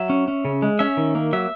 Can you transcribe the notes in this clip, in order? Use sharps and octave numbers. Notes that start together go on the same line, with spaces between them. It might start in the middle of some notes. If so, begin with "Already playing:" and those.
Already playing: F#3 E5
C#4
C#4
C#3
G#3
C#4 E5
D#3
A#3
F#3 E5